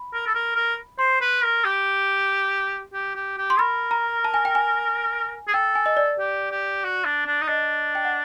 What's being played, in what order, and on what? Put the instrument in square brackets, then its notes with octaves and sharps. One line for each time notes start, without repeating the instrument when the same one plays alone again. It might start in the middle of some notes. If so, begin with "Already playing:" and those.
Already playing: [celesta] B5
[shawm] A#4
A4
A#4
A#4
[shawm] C5 [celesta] C6
[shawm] B4
A#4
G4
G4
G4
G4
[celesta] C6
[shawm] A#4 [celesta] B5
[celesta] A#5
A5
G#5
G5
G#5
[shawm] G#4
[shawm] A4 [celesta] G5
[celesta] G#5
D#5
D5
[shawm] G4
G4
F#4
D4
D4
D#4
[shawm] D4 [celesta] D#5
[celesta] G5
F#5